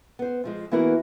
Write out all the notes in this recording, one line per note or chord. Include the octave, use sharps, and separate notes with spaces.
B3 C5
F2 F3 G#3
E3 A#3 B3 E4 F#4 A#4